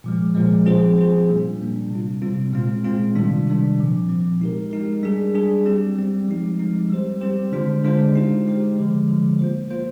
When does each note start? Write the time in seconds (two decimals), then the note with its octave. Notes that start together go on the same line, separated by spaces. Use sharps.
0.04 A#2 F3 G#3
0.35 A#2 F3 G#3
0.66 F3 C4 F4 G#4 C5
0.97 F3 C4 F4 G#4 C5
1.28 A#2 G3 A#3 D4
1.60 A#2 G3 A#3 D4
1.90 C3 G3 C4 F4
2.22 C3 G3 C4 F4
2.53 A#2 G#3 C4 F4
2.84 A#2 G#3 C4 F4
3.15 C3 D#3 G3 D4
3.47 C3 D#3 G3 D4
3.79 A#2 F3 C4
4.09 A#2 F3 C4
4.40 G#3 D#4 G4 A#4
4.71 G#3 D#4 G4 A#4
5.03 G3 D4 G#4
5.34 G3 D4 G#4
5.65 G3 C4 G4
5.96 G3 C4 G4
6.28 F3 G#3 C4 D#4
6.59 F3 G#3 C4 D#4
6.90 G3 C4 G4 C5
7.21 G3 C4 G4 C5
7.52 D3 G#3 D4 F4 C5
7.84 D3 G#3 D4 F4 C5
8.15 G#3 D#4 G4 C5
8.46 G#3 D#4 G4 C5
8.77 D3 F3 G#3
9.08 D3 F3 G#3
9.39 A#3 F4 C5
9.70 A#3 F4 C5